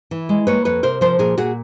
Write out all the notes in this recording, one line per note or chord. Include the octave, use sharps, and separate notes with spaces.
E3
G#3
A#3 B4 C#5
F2 B4 C#5
C3 A#4 C5
F3 A#4 C5
A#2 G#4 A#4
A#2 F#4 G#4